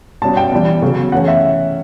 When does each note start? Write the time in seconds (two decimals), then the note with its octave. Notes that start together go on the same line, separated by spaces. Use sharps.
0.22 B2 G3 C#4 A5
0.37 G5
0.52 E3 G3 B3
0.82 C#3 F#3 B3
1.12 E3 A3 C#4 F#5
1.28 E5